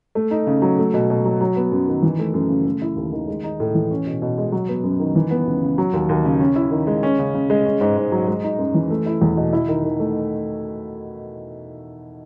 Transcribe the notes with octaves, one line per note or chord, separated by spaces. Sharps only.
A3
D#4
C#3
F#3
A3
B2
B2
F#3
F#3
B3
F#2
D#3
E3
A3
F#2
C#3
A3
E4
D#2
D#3
G#3
D#4
A2
E3
C#4
B2
B2
G#3
F#3
B3
F#2
D#3
E3
B3
C#2
C#3
F#3
D#2
D#2
C#3
C#4
E4
D#3
G#3
C#4
C#3
C#3
G#3
C#4
G#2
G#2
F#3
G#3
D#4
F#2
E3
A3
E4
E2
B2
E4
D#3
D#3
A3